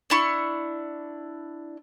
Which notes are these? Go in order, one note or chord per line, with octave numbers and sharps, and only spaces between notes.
D4 E4 C#6